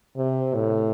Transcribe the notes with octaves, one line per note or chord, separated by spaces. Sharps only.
C3
A2